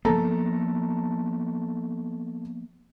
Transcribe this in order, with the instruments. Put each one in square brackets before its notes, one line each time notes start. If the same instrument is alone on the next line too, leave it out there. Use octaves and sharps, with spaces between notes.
[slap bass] F3 A#3 B3 [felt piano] A4 A5 A#5